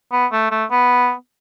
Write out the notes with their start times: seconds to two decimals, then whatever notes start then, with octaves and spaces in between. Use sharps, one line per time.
0.12 B3
0.32 A3
0.51 A3
0.71 B3